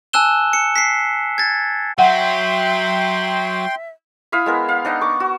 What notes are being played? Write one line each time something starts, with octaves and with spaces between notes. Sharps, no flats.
G#5 A5 E6 F#6 E7 G7
C#7
B6 C7
G#6 A6
F#3 E5 F#5 G5 C6
E4 E5 F5 D#6
G#3 B3 A#4
F5
D4 D#4 D#5 F#5
C#6 D6
F#4